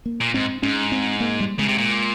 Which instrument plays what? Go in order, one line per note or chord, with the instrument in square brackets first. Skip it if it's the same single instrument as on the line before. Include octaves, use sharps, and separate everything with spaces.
[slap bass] A#3
[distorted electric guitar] A#2
[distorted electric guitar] G#2 [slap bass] C4
[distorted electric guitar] G#2 [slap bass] C#4
[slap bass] C4
A#3
G3
[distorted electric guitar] C#3 [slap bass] G#3
[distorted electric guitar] C3
A#2